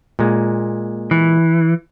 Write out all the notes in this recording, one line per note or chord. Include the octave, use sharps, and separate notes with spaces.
A#2 G#3
E3